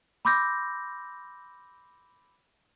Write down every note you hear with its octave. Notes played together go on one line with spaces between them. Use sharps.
B5 C6 D6 E6 G6 A#6